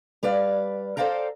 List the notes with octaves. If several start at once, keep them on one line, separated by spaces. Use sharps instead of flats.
G3 B4 D5 F5
A4 C5 D5 F5 G5 A#5